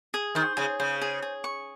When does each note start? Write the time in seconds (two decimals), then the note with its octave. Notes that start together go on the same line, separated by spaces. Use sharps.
0.14 G#4
0.35 D#3 C5
0.57 C#3 G#4
0.80 C#3 C5
1.02 G#4
1.22 G#4
1.44 C#6